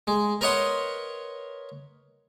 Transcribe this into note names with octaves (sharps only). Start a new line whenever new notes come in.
G#3
A#4 B4 C#5 D#5 F#5 C6